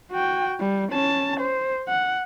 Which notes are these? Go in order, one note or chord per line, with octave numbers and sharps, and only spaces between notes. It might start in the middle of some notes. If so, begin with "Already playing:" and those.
F#4 G5
G3
C#4 A5
C5
F#5